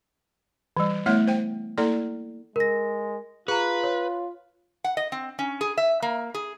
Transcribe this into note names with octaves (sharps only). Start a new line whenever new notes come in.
E3 G3
A3 B3 E4 C#5 E5 F#5
C5 G5
A#3 E4 A4 D5 A#5
G#3 A#4 A#6
F4 G#4 B4 A#5
C#5
F#5
D#5
C4
C#4
G#4
E5
A#3
G#4